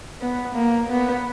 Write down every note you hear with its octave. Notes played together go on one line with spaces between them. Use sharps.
B3
A#3
B3